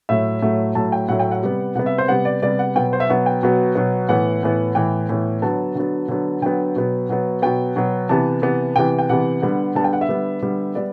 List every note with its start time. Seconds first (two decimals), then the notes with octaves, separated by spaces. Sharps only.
0.09 A2 F#3 A3 E5
0.42 A2 F#3 A3
0.75 A2 F#3 A3 A5
0.92 G5
1.08 A2 F#3 A3 F#5
1.20 G5
1.31 F#5
1.43 C3 G3 B3
1.75 C3 G3 B3 F#5
1.86 E5
1.98 C5
2.08 C3 G3 B3 F#5
2.25 D5
2.42 C3 G3 B3 D5
2.59 F#5
2.75 B2 F#3 B3 G5
2.93 C5
3.00 E5
3.09 B2 F#3 B3
3.26 G5
3.43 B2 F#3 B3
3.75 B2 F#3 B3
4.09 A2 E3 B3 F#5
4.43 A2 E3 B3
4.75 A2 E3 B3 G5
5.09 A2 E3 B3
5.42 D3 F#3 B3 A5
5.75 D3 F#3 B3
6.08 D3 F#3 B3
6.42 D3 F#3 B3 G5
6.76 B2 F#3 B3
7.09 B2 F#3 B3
7.42 B2 F#3 B3 G5
7.76 B2 F#3 B3
8.09 C3 E3 B3 A5
8.42 C3 E3 B3
8.76 C3 E3 B3 G5
8.99 G5
9.09 C3 E3 B3 F#5
9.42 D3 G3 B3
9.75 D3 G3 B3 A5
9.84 G5
9.93 F#5
10.01 E5
10.09 D3 G3 B3
10.42 D3 G3 B3
10.75 G3 B3 D5